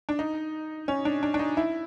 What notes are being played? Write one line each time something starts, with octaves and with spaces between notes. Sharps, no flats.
D4
D#4
C#4
D4
D4
D4
D#4
E4